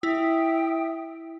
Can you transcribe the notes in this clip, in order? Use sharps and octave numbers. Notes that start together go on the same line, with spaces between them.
E4 E5 G5 D#6